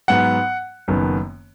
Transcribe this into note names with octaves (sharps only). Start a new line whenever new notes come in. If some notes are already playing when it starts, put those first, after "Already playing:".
G#2 F#3 B3 F#5
F#1 F#2 D#3 B3